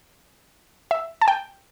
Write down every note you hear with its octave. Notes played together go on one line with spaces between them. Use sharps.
E5
A5
G5